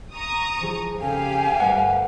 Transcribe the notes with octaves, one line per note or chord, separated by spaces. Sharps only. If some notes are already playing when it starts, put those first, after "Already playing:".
A#5 C#6 D#6
E3 F3 G#4
F2 C#3 G4 A4 F5 G#5
D2 G2 A#4 F#5